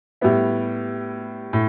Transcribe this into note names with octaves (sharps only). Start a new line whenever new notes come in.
A2 G3 B3 E4
A2